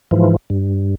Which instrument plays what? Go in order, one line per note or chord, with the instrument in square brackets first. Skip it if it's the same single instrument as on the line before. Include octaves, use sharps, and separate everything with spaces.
[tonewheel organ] G#2 E3 F3
G2